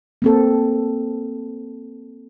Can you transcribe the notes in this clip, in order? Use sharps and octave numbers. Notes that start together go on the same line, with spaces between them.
A#3 C4 A4